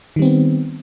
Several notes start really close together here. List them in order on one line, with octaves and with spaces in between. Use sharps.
D#3 G3 C4 B3